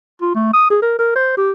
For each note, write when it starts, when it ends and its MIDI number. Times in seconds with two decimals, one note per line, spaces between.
0.22 0.32 65
0.35 0.51 57
0.54 0.67 87
0.70 0.78 68
0.82 0.97 70
0.99 1.15 70
1.16 1.37 72
1.37 1.52 67